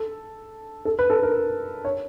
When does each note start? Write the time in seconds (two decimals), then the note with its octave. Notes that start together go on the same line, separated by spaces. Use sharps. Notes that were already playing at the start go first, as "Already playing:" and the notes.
Already playing: A4
0.85 A4
0.99 B4
1.10 A4
1.23 A#4
1.85 C#5